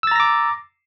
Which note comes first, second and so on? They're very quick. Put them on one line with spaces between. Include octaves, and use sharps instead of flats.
E6 A6 A#5 A#6 D6